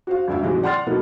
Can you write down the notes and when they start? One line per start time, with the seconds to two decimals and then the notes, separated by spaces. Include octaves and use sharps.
0.07 F#4 C5 F5
0.28 G1 D2 E5 F5
0.42 G#2 C3 E3 F#3 G#3
0.63 D5 F#5 G5 C6 F6 A6
0.87 B2 F#3 A#3 B3 D#4 A4